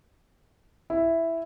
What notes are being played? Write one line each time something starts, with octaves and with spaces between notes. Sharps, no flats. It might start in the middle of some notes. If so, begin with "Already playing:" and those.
E4